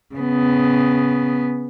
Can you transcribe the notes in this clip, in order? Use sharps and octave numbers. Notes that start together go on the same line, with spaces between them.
C#3 B3